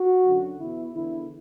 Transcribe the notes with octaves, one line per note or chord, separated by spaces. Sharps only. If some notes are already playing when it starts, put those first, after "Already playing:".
Already playing: F#4
F#2 D3
E2 B2 E4
E2 D3 E4